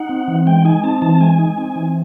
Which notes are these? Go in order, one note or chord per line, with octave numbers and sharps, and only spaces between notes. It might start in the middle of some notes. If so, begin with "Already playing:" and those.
Already playing: D#4 F#5
C4
E3
G#3 G5
D#4 G#5
C4 A5
E3 A5
G#3 G#5
D#4
C4
E3